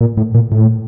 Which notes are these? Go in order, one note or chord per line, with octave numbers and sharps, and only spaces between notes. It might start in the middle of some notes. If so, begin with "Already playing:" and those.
A#2
A2
A#2
A2